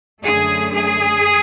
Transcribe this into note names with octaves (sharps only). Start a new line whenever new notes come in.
F#2 D3 A3 G#4
G#4